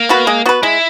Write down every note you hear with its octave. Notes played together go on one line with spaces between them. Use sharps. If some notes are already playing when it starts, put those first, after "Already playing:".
Already playing: A#3
B3 F#4 B4
G#3
B3 F#4 B4
G#3 E4